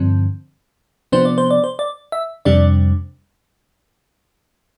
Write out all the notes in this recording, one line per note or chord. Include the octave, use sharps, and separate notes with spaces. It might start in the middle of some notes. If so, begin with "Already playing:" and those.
Already playing: G2 D3 F3 C4
C3 F3 B3 D4 C5
D5
C5
D5
C5
D5
E5
F2 C3 G3 D4 D5